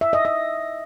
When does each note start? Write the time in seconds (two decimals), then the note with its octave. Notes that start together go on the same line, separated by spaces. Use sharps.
0.01 E5
0.13 D#5
0.25 D#5